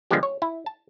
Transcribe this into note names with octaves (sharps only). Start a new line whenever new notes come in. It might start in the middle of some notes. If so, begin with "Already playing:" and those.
D3 F3 G3 G#3 B3 G4
C#5
E4
A5